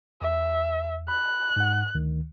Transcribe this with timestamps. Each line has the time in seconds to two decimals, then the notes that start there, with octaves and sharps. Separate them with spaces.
0.22 E2 E5
1.08 B5 F#6
1.56 G#2 F#5
1.95 D2 D#3